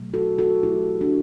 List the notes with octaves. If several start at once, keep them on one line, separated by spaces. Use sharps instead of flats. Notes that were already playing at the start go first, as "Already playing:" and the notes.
Already playing: B2 F#3 A3
F#4 A4
F#4 A4
B2 F#3 A3 E4 G4
D4 F#4